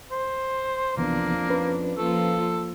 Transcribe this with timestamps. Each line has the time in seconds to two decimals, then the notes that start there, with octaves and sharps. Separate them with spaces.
0.11 C5
0.97 C2 F2 E3 A#3 B3 D4
1.49 C#4 B4
1.97 F3 A#3 F4 A4